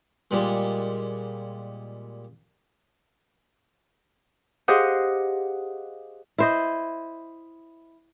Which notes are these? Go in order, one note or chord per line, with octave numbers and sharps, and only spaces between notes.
A#2 G3 G#3
G4 G#4 C5 D#5 F5 F#5
E4 C5 D#5